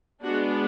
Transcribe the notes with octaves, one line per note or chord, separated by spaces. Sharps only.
G#3 B3 D4 F#4